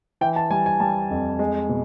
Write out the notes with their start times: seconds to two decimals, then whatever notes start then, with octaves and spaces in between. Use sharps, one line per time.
0.21 E3 G5
0.36 A5
0.50 G3 G#5
0.66 G#5
0.80 G3 A5
1.10 F2
1.39 G#3
1.69 B2